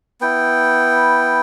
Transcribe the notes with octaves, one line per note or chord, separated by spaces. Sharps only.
B3 E4 G5